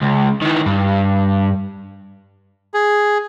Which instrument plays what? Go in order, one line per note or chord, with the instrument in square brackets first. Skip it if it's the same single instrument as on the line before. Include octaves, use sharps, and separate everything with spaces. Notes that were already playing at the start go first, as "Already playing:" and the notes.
[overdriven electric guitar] C#2
D#3 E3
G2
[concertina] G#4